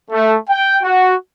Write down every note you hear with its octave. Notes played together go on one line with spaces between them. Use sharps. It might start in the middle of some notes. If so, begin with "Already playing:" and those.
A3
G5
F#4